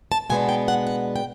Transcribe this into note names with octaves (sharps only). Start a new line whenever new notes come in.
A5
B2 G#3 B3 D4 G#5
G5
F#5
F#5
G5